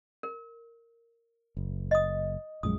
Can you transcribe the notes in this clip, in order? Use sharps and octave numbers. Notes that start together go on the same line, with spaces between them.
A#4
F#1
D#5 D#6
A#1 F#2 G#3 D#6